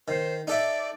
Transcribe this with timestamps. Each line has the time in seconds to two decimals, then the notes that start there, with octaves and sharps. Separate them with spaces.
0.08 D#3 C5
0.47 D#4 A4 D5 E5